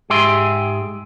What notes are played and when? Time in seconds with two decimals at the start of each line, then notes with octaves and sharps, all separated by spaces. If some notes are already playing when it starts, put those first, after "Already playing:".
0.10 G#2 G4 G#4 E5 C6